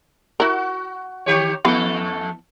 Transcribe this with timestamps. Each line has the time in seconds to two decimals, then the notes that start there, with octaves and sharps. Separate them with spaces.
0.40 E4 F#4 A#4
1.26 D#3 G4 C#5
1.65 F2 E3 A3 B3 A4 F5